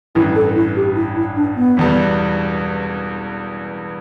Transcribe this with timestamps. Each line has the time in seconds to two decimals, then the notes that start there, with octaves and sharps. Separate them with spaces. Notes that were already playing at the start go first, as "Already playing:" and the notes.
0.15 A1 G2 E3 E4
0.36 A4
0.56 E4
0.76 G4
0.96 E4
1.17 E4
1.37 D4
1.56 B3
1.77 E1 E2 E3 G3